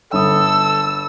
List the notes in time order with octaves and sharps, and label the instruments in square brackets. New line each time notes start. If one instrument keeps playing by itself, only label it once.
[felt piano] G1 D#6 [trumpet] A4 [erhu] E6